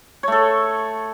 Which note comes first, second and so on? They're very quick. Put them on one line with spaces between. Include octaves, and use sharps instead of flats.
C#5 A3 A4